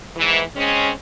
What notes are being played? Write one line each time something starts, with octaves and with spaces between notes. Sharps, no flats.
G#2 E3
G#3 C4 C#4